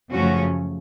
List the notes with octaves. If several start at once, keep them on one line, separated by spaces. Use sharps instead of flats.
F#2 C#3 F3 A3 C#4 F#4